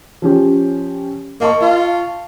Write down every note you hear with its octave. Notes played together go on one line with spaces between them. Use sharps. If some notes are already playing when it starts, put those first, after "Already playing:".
F3 C#4 G4
A#3 D#5 A5 C#6
F4